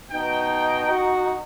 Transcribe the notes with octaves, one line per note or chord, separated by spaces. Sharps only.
B2 D#4 G5
F#4